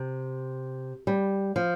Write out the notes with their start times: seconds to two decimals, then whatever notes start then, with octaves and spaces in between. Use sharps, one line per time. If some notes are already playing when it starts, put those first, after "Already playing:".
Already playing: C3
1.07 G3
1.56 F3